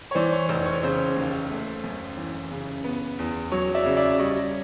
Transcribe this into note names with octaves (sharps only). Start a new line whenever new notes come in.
C#5
E3 C5 D5
C#5
F1 C5
C#5
C#3 C5
D#2
A3
F#2
E3
C#3
B3
E2
F#3 C#5
D5 E5
C#3
D5 E5
G3 C#5 D#5